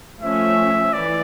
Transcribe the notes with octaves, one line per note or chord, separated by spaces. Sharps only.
F3 A3 C#4 E5
E3 D5